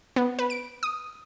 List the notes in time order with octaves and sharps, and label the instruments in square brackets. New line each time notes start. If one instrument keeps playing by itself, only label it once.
[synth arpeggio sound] B3
B4
D7
D#6